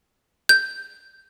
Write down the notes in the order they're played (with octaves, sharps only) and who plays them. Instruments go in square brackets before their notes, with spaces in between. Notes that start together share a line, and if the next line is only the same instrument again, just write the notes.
[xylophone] G6